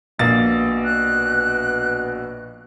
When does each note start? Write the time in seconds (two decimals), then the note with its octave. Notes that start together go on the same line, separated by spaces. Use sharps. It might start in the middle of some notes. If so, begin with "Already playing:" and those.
0.19 A#1 B2 A#3 A6
0.85 F#6